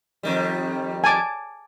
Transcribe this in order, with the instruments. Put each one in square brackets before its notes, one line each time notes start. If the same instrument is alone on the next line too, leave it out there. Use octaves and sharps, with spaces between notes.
[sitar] F2 D#3 G3
[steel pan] G#5 A5 D6